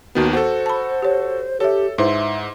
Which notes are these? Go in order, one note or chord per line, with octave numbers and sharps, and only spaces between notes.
D#2 D#3 B3 F#4
F#4 A4 C5
A5 B5
G4 C#5
G4 A4 C#5 E5
G#2 E4 B4 C5 E5 C6